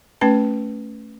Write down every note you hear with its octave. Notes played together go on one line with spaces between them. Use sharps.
A3 C#4 B4 A5